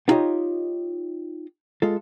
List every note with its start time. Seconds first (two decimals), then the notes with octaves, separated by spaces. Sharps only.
0.08 B3 D#4 F4 G4 C#5 D#5
1.82 G#3 F4 A4